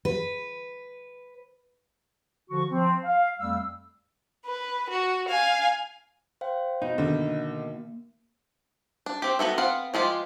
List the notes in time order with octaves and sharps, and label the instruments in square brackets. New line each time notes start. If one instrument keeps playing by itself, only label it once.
[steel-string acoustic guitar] B4
[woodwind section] D3 F3 F#4 C#6
F3 C4
F5
F2 G3 A3 F5 E6
[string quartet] B4
F#4
F5 G#5
[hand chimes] C5 F5 G5
[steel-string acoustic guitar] B2 [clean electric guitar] D#4 [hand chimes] B4
[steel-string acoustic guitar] B2 D#3 [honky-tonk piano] D3 [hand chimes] A#3
[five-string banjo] D4
C4 G4
B3 F#4 A4 E5
B3 C4 F5 F#5
F3 G#3 F4 G4